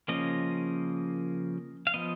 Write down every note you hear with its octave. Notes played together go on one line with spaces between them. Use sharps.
C#3 F3 A#3 C#4 D#5
F5
F3 B3 D#5